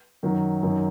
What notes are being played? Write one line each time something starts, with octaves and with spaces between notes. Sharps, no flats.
F#2 D#3 F#3
F#2 D#3 F#3